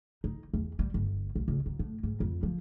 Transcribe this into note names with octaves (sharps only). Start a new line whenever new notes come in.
D#4
E2
G3
G1
B1
C#2
D#2
A2
G#2
F2
F3